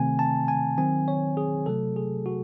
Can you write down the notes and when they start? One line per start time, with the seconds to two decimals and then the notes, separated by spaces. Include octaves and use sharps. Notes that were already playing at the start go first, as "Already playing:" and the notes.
Already playing: C3 D#3 A3 C4 G#5
0.19 A5
0.48 G#5
0.78 D#3 F#3 C4 G#5
1.08 C#5
1.37 G#4
1.66 C3 F#3 A3 A4
1.96 G#4
2.26 F#4